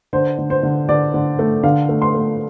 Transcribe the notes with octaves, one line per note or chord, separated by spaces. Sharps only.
D3 C5
D3
C5
D3
D3 D5
D3
A3
D3 F5
A3
C6
A3